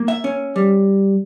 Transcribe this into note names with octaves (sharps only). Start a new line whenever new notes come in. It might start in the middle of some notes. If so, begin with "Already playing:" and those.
Already playing: A#3
E5
C#4
G3